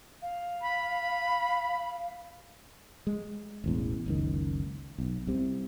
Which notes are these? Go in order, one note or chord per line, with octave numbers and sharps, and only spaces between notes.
F5
B5
G#3
E1 A1 E2
F#1 C#2 D#3
B1
C2 C3